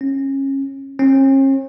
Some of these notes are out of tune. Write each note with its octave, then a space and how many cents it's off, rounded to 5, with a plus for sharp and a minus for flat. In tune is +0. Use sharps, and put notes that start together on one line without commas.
C#4 -25
C#4 -45